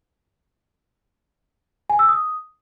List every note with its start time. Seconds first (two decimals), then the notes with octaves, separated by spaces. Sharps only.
1.90 G#5
1.99 E6
2.09 D#6